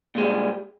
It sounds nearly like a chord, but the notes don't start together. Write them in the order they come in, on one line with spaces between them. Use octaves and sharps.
A#2 G#3 G3